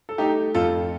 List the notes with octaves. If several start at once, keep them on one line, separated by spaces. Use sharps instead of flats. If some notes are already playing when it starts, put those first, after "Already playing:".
A4
A3 D#4 G4
F2 F4 A4